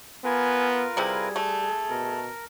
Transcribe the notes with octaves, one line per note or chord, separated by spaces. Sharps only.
B3 F4 A#4 B4 G#5
C3 G3 E4 G#4
A3
B2 A#4